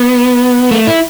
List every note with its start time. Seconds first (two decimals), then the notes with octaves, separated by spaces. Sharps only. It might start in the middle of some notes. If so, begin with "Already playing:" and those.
Already playing: B3
0.71 A3
0.87 E4